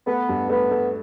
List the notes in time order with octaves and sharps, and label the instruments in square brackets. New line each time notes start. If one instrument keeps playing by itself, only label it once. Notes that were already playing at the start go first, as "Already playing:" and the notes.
[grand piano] A3 [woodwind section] B3
[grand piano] G2
[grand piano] A3 [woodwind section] B3
[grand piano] A3